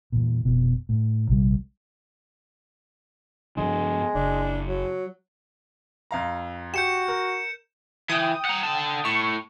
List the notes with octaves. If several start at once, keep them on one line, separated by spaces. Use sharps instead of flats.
E2 A#2
F1 B2
A2
A#1 C3 G3
G2 F3 G#3 D4
F#1 D4
F#3
F2 F5 A#5
F#4 G4 G6 C#7 E7
A#4
E3 G5 D#6
F#5 A#5
D3 A5
A2 C#6